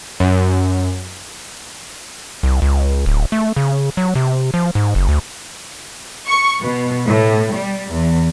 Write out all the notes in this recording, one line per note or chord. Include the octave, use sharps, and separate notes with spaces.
F#2
C2
C#2
D1
A3
C#3
F#3
C3
F3
G#2
F#1
D2
C#6
B2
A2
G3
E2